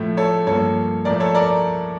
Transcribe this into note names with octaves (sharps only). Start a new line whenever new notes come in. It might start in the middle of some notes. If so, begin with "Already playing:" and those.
Already playing: A2 F3 A3
A4 C#5
G2 F3 A#3 A4 C#5
A2 F3 A3 A#4 D5
A4 C#5
A#4 D5